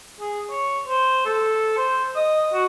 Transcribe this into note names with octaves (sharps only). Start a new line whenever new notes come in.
G#4
C#5
C5
A4
C5
D#5
F#4